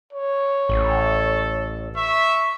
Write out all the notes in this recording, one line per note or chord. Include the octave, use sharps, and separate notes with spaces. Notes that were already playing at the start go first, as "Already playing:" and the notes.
C#5
A1 A4
E5 C#6